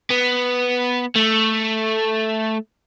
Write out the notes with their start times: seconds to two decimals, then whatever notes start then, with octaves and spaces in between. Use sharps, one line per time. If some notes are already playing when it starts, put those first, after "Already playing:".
0.11 B3
1.15 A3